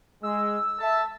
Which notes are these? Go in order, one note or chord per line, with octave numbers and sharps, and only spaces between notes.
G#3 E6
A4 E5 A5